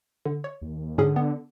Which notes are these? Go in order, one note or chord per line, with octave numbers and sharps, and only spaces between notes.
D3
C#5
D#2
G#2 D3 C#4 G#4
B3